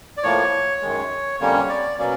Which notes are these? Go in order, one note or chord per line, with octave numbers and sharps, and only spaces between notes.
D5
A2 F3 A#3 C#5
F#2 D#3 G#3
F2 D3 G3 A#3 C#4 C#5
D5
B2 F#3 A#3 C#4 D5